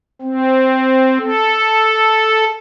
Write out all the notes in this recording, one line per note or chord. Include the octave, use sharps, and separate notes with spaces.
C4
A4